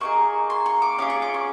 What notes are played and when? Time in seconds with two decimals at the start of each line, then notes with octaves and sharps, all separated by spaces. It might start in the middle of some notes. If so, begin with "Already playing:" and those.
0.01 A#3 D#4 G#4 C#6
0.50 C6
0.66 C#6
0.82 D6
0.98 C#4 F4 G#4 D6
1.10 C#6
1.22 D6
1.34 C#6